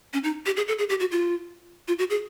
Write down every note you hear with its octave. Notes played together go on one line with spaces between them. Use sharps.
C#4
D#4
G4
G#4
A4
G#4
G4
F#4
F4
F4
F#4
G#4